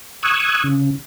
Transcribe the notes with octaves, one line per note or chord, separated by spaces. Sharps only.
C#6 D#6 E6 F#6 G#6
C#3